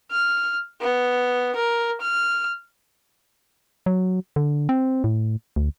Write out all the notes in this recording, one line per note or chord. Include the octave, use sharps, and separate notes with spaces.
F6
B3
A#4
F6
F#3
D3
C4
A2
D2